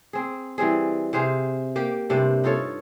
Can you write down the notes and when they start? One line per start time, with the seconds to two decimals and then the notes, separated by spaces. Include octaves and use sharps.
0.13 C4 G#4
0.58 E3 G3 C4 G#4
1.13 C3 G#4 C5 F5
1.76 A#3 G4
2.10 G2 C3 D4 C5
2.44 D#4 F4 A4 C#5